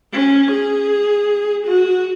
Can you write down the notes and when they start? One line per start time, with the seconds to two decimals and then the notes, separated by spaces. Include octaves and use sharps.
0.13 C#4
0.51 G#4
1.67 F#4